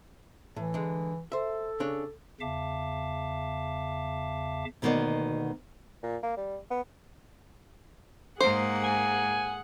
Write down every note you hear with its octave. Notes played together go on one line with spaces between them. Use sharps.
A2 E3
D3 G#3
A4 C5 E5
C#3 D4 C#5
E2 C#3 E5 F5 A5 D6
D2 B2 D#3 A#3 B3 D5
A#2
A#3
G3
B3
G#2 A#3 G#4 C5 F#5
G#5